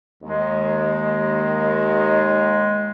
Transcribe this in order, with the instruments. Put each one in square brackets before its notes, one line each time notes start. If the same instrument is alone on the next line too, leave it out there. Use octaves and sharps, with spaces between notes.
[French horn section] D#2 [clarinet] G#3